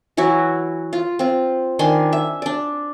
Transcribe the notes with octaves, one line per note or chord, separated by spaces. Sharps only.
E3 F#3 E4 F#4
F4
C4 F4
D#3 D4 G#5 C6
E5
D4 D5